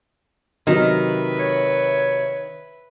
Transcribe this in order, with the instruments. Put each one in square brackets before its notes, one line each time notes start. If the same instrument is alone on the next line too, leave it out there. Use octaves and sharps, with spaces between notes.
[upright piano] C3 F#3 [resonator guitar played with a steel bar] D#3 [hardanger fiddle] B4 E5
[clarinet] C#5